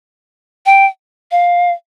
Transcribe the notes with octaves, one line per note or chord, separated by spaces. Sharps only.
G5
F5